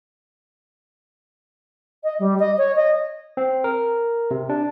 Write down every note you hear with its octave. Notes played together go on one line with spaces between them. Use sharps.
D#5
G3
D#5
C#5
D#5
C4
A#4
C3
D4